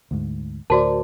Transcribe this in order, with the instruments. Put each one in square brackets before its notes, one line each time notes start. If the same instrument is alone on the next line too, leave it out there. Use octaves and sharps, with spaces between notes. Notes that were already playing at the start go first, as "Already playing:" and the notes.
[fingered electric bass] D2 G#2
[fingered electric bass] D2 A2 [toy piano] F#4 A5 [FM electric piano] A#4 C5 D5